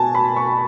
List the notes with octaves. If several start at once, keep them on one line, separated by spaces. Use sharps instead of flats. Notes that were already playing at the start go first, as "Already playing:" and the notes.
Already playing: B2 G#5 A5
B5
C#6